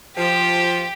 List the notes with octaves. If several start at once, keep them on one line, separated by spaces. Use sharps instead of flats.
F3 G4